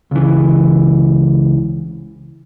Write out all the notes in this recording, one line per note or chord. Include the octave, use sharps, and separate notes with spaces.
C#2 E3